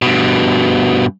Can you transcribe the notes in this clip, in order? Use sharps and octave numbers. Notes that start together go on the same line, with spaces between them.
G2 B2